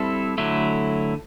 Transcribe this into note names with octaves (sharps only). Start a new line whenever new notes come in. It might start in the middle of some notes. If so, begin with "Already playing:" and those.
Already playing: G3 C4 E4 A4
D3 F#3 A3 E4